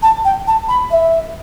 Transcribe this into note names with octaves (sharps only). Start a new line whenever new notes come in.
A5
G5
A5
B5
E5